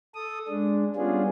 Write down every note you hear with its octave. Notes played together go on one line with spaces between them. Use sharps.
A4 D#6
G#3 D4
G3 B3 C#4 D4 F4 G#4